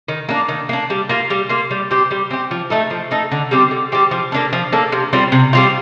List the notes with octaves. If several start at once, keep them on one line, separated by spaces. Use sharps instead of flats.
D#3
A#3 D4
D#3
A#3 D4
G3
A#3 F4
G3
A#3 F4
G3
C4 G4
G3
C4 G4
F3
A3 D#4 A4
F3
A3 D#4 A4
D3
G3 C4 G4
D3
G3 C4 G4
F3
A#3 D4 A4
F3
A#3 D4 A4
C3
G3 C4 F4
C3
G3 C4 F4